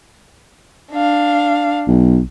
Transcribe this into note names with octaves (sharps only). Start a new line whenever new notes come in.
D4 F5
B1